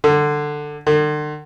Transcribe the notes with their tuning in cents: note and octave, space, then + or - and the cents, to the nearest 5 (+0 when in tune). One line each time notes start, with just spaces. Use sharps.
D3 +15
D3 +45